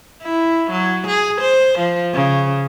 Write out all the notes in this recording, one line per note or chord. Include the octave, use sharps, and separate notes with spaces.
E4
F#3
G#4
C5
F3
C#3